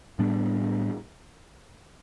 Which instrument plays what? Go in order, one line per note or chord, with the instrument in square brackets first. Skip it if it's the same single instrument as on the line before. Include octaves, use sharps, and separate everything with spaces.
[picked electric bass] A2 G3 B3 D4